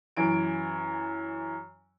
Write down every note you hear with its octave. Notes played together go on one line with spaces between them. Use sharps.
F#2 E3 D7